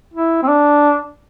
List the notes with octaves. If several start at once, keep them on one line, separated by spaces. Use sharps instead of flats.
E4
C4
D4